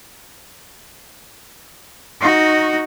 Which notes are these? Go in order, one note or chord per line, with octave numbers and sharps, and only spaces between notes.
D#4 F#4